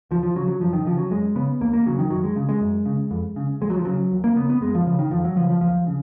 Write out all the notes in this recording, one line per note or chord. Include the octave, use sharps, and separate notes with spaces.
D#2 F3
F3
C#3 F#3
F#3
F#2 F3
D#3
C#3 F3
F#3
F#2 G#3
C#3 B3
D#2 A#3
A#3
C#3 F#3
D#3
F#2 F#3
G#3
C#3
G#3
F#2
C#3
F2
C#3
D#2 G#3
F#3
F3
C#3 F#3
D#2
A#3
C#3 B3
B3
F#2 G#3
F3
C#3 F3
D#3
F2 F3
F#3
C#3 F3
F3
D#2 F3
C#3